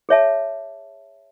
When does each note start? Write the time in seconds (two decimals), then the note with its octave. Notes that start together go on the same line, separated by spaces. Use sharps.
0.09 G#4 C#5 E5 A5